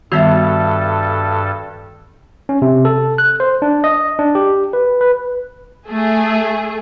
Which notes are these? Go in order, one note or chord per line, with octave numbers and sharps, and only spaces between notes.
G2 D#3 G3 B3 F#4 A4 E5
C#4
C3
A4
F#6
C5
D4
D#5
D4
G4
B4
B4
A3 G#4